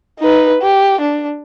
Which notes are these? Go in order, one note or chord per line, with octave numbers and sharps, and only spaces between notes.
D#4 B4
G4
D4